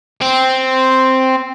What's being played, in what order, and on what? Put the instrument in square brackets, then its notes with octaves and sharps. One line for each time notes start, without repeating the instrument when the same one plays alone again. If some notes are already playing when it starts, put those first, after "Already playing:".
[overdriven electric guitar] C4